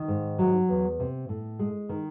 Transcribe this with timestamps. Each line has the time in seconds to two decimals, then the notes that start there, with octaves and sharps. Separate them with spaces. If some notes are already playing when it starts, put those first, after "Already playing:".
Already playing: D#3
0.08 G#2
0.39 F#3
0.69 E2
1.00 C3
1.29 A2
1.59 G#3
1.89 D#3